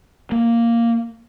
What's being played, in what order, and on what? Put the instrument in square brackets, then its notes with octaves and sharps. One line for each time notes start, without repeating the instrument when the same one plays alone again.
[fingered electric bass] A#3